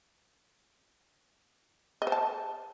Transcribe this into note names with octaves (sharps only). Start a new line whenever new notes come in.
D#5
C5
A5